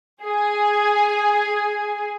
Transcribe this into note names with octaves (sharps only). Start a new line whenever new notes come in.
G#4 G#5